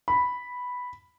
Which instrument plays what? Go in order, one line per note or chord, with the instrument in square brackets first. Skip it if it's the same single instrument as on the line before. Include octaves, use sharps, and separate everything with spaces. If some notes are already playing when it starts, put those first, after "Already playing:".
[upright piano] B5